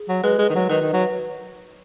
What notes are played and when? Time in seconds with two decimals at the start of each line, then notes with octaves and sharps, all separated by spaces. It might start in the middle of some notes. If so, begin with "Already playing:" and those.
Already playing: G#4
0.08 F#3
0.23 G#3 B4
0.38 G#3
0.49 D#3
0.55 F#3
0.70 D#3 B4
0.82 D#3
0.93 F#3